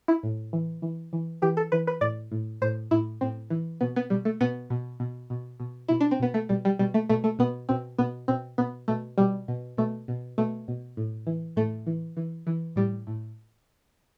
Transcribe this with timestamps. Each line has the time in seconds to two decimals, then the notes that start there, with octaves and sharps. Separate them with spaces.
0.08 E4
0.23 A2
0.53 E3
0.82 E3
1.13 E3
1.42 E3 G4
1.57 A4
1.72 E3 B4
1.87 B4
2.01 A2 D5
2.32 A2
2.62 A2 C5
2.91 A2 E4
3.21 A2 C4
3.50 E3
3.81 B2 B3
3.96 B3
4.10 B2 G3
4.25 A3
4.41 B2 B3
4.70 B2
5.00 B2
5.30 B2
5.60 B2
5.88 B2 E4
6.01 D4
6.11 C4
6.20 B2 B3
6.34 A3
6.49 B2 G3
6.65 G3
6.79 B2 G3
6.94 A3
7.10 B2 A3
7.24 A3
7.39 B2 B3
7.69 B2 C4
7.98 B2 B3
8.28 B2 C4
8.58 B2 B3
8.88 B2 A3
9.18 B2 G3
9.48 B2
9.77 B2 A3
10.08 B2
10.38 B2 A3
10.68 B2
10.97 A2
11.27 E3
11.56 A2 A3
11.87 E3
12.17 E3
12.47 E3
12.76 A2 G3
13.07 A2